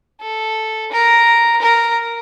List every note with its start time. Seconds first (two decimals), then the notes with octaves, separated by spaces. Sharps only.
0.21 A4
0.92 A#4
1.61 A#4